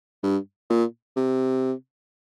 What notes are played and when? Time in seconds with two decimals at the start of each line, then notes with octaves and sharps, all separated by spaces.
0.23 G2
0.69 A#2
1.16 C3